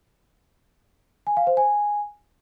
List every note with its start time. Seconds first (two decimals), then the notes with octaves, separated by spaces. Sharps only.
1.27 G#5
1.37 F5
1.47 C5
1.57 G#5